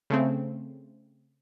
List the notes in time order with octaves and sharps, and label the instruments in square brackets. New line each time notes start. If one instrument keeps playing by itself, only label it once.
[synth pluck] C#3 A3 C4